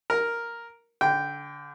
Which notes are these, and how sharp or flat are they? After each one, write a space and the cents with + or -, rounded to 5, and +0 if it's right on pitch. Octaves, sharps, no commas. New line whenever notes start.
A#4 +0 A#5 +0
D3 -25 G5 -5